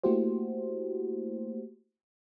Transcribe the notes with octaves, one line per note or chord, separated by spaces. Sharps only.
A3 A#3 E4 F#4 G4 C5